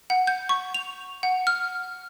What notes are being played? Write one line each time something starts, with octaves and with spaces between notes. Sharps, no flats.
F#5
G6
C#6
F7
F#5
F6